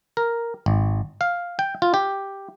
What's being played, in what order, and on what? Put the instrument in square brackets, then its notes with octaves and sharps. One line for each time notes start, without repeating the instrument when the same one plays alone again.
[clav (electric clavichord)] A#4
G#1
F5
G5
F4
G4